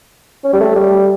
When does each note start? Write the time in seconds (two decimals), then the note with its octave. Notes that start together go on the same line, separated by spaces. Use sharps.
0.44 C#4
0.53 G3
0.61 A3
0.76 G3